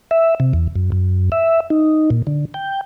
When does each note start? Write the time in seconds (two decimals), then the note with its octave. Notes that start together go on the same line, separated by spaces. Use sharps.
0.11 E5
0.40 C3
0.53 E2
0.76 F#2
0.92 F#2
1.32 E5
1.70 D#4
2.10 A#2
2.27 D3
2.54 G5